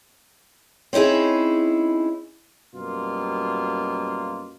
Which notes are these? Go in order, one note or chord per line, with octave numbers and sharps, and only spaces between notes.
C4 C#4 D#4 E4 G#4
F#2 B2 G3 A#3 F4